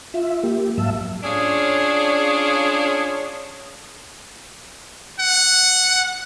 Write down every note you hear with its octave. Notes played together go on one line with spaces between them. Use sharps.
F4 E5
A#3 G4
G#2 F#3 E5 F5 A5 E6
C#4 D4 F4 G#4 C#5 D5
F#5